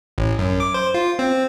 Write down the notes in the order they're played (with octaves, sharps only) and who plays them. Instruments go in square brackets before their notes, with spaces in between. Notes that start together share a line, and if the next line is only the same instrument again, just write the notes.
[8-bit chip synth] A1
F#2
D6
C5
F4
C4